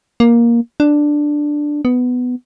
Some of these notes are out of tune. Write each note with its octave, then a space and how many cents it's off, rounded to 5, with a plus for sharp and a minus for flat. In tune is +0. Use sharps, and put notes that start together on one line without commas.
A#3 +10
D4 +5
B3 +10